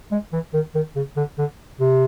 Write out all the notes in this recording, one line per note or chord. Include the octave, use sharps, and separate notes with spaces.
G#3
E3
D#3
D#3
C#3
D3
D3
C3